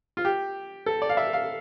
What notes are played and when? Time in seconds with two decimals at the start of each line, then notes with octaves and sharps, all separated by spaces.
0.17 F4
0.25 G4
0.86 A4
1.02 D5
1.10 F5
1.17 E5
1.33 F5